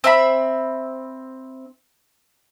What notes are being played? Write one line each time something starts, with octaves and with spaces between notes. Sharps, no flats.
C4 E5 B5